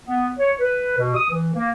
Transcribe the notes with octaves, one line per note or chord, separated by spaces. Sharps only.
B3
C#5
B4
B2
D#6
E3
A#3